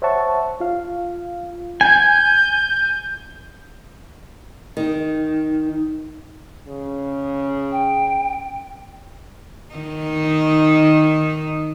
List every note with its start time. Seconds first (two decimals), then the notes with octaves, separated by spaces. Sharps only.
0.02 C5 C#5 E5 F#5 A5 C#6
0.60 F4 F5
1.81 G#5 G6
4.77 D#3
6.68 C#3
7.72 G5
9.75 D#3 D#4